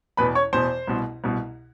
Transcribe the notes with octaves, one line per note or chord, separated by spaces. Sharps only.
E2 B2 B4 B5
C#5 C#6
E2 B2 C5 C6
C2 B2
C2 B2